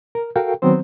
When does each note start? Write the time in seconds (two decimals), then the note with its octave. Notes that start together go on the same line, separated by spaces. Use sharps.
0.15 A#4
0.36 F#4 A4 A#4 F5 G5
0.62 D#3 F#3 B3 C4 C5